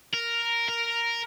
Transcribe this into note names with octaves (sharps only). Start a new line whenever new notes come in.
A#4
A#4